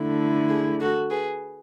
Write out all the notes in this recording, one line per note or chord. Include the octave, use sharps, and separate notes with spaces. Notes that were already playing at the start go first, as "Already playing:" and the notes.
Already playing: D3 A3 E4
G#4
F#4 A4
G#4 B4